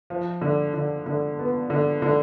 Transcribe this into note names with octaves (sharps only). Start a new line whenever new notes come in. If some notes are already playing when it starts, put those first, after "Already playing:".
F3
D3
D3
D3
B3
D3
D3